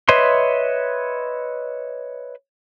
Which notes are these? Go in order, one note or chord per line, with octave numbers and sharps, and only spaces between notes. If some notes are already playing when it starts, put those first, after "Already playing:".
B4 C#5 D#5 E5 C6